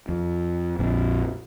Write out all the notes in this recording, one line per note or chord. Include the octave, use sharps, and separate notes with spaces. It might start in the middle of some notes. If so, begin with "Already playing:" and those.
F2
A#1 F2